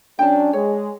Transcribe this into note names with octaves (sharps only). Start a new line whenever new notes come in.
F#3 C#4 D4 G5 A5
G#3 C#5